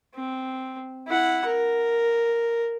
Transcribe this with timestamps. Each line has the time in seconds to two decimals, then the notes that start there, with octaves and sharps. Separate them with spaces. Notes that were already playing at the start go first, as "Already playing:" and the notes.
0.15 C4
1.07 E4 F#5
1.45 A#4